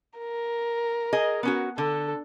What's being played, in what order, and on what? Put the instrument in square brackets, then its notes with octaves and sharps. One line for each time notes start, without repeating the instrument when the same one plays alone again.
[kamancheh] A#4
[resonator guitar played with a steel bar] G#4 D#5
B3 C#4 F#4
[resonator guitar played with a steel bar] D3 [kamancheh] A4